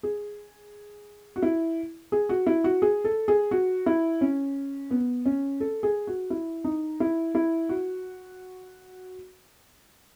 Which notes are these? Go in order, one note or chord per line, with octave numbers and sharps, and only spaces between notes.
G#4
F#4
E4
G#4
F#4
E4
F#4
G#4
A4
G#4
F#4
E4
C#4
B3
C#4
A4
G#4
F#4
E4
D#4
E4
E4
F#4